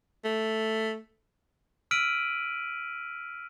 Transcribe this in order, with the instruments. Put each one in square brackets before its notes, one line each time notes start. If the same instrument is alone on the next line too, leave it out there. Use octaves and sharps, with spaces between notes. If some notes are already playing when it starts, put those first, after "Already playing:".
[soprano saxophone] A3
[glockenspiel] E6 F6 B6 D7 D#7 F#7